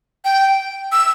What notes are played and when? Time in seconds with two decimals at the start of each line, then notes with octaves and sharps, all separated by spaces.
0.25 G5
0.92 E6